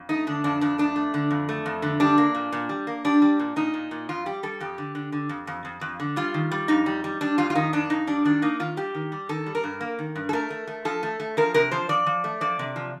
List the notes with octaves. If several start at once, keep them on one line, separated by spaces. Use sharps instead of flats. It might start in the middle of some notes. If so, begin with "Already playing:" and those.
Already playing: F2
A3 D#4
D3 D4
F2 D4
F2 D4
A3 D4
A3
D3
F2
A3
F2
D3
G3 D4
A#3
A#2
A#2
G3
A#3
G3 D4
G3
A#2
A#2 D#4
A#2
A#2
F2 F4
G3 G4
G3 A4
F2 G4
D3
D3
D3
F2
F2
F2
F2
D3
G3 F4
D#3
G3
F2 D#4
G3
G3
G3 D4
F2 F4
F4
D#3 D#4
F2 D4
F2 D#4
G3 D4
D#3 D4
A#3 D#4
D#3 F4
G3 G4
D#3
G3
D#3 A4
G3
A#4
G2
A#3
D#3
G2
A4
A3 A#4
A3
A3
F3 A4
A3
A3
F3 A#4
C3 A#4
F3 C5
F3 D5
F3
A3
F3 D5
C3
F3